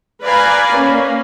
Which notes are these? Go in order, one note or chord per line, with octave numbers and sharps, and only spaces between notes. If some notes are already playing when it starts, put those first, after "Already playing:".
B4 D5 F5 G#5 A#5 B5
A#3 C#4